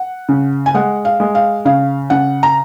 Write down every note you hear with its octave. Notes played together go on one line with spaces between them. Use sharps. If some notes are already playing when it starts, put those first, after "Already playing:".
Already playing: F#5
C#3
G#5
G#3 F#5
F5
G#3
F5
C#3 F5
C#3 F#5
A#5